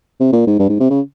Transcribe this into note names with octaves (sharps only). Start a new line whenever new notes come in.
C3
A#2
G#2
G2
G#2
C3
C#3